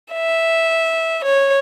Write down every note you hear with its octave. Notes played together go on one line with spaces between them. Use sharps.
E5
C#5